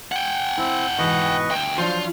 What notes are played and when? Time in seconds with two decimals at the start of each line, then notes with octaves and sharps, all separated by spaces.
0.12 F#5 G5
0.58 C4 E4
0.99 G#2 B2 E3 B4 D#5 C#6
1.51 D2 G5
1.78 F3 F#3 D4 F4 C5